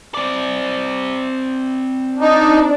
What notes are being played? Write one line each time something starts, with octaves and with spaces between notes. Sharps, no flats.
C4 D5
D4 D#4